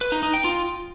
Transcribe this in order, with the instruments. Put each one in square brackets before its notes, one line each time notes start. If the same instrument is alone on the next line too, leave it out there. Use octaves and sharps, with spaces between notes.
[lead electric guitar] B4
D#4
D#4
G5
F4